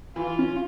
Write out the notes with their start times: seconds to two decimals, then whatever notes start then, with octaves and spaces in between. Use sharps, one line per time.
0.16 E3 F4
0.39 C#4